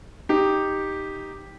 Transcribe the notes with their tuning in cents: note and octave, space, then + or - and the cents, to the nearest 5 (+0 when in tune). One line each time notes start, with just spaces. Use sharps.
D#4 +0 G4 +0